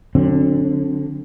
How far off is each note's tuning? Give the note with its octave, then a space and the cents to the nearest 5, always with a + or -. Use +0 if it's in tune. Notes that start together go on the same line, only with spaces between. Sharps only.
D3 +0 F#3 -20 C4 +40